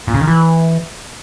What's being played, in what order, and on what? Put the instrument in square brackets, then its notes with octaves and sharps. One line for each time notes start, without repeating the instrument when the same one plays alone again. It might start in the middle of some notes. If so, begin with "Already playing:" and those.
[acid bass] A#2
C#3
D#3
E3